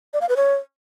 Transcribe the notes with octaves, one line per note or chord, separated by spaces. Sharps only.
D5
F5
B4
C#5